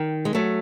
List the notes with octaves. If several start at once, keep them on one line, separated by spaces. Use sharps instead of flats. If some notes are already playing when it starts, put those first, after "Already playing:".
Already playing: D#3
G#3
F#3 A3